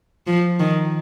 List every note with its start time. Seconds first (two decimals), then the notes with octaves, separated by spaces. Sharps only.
0.27 F3
0.60 D#3